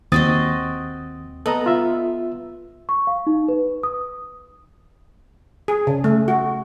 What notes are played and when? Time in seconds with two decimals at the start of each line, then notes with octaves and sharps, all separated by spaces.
0.12 D#2 C4 F#4 D#5 D#6 A6
1.46 B3 A4 D#5 A#5
1.66 F4 E5
2.89 C#6
3.07 F5
3.27 D#4
3.48 B4
3.83 D#6
5.68 G#4
5.87 C#3
6.04 A3
6.28 F#4